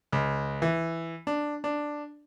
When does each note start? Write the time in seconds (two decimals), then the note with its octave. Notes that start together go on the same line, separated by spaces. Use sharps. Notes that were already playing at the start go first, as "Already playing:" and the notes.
0.12 C#2
0.62 E3
1.27 D4
1.64 D4